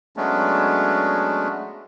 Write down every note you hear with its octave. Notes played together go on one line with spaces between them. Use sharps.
F#3 G#3 A3 B3 C#4 D4